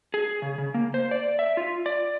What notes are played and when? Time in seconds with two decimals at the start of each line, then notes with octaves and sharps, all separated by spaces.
0.14 G#4
0.42 C#3
0.58 C#3
0.74 A#3
0.94 C5
1.11 D5
1.39 E5
1.57 F4
1.86 D5